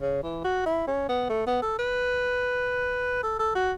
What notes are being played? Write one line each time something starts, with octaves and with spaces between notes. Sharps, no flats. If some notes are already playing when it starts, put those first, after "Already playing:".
C#3
E3
F#4
E4
C#4
B3
A3
B3
A4
B4
A4
A4
F#4